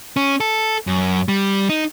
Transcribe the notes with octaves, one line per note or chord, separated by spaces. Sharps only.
C#4
A4
F#2
G3
D#4